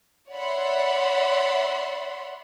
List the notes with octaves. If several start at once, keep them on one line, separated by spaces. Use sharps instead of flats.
C#5 D5 E5 F#5 B5 C6